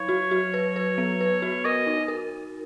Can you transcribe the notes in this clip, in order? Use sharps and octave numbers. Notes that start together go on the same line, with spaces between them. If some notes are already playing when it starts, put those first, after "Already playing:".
Already playing: F#3 C#5
F#4
F#4
B4
B4
B3
B4
F#4
A#4 D#5
D#4
A#4